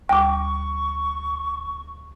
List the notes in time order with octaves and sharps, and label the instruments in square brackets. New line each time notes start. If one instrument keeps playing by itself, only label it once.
[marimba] D2 G3 [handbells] G5 D6 [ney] C#6